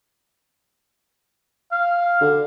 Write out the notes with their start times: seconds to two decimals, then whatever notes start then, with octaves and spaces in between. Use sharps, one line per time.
1.72 F5
2.21 D3